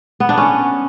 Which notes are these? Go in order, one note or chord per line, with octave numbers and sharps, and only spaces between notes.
B3
D4
C#4